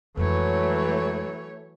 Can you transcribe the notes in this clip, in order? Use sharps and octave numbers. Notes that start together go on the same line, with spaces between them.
F2 E3 F#3 G#3 A3 C#5